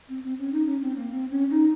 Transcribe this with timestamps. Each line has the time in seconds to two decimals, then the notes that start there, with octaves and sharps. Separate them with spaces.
0.09 C4
0.24 C4
0.38 C#4
0.52 D#4
0.67 C#4
0.81 C4
0.96 A#3
1.11 C4
1.30 C#4
1.50 D#4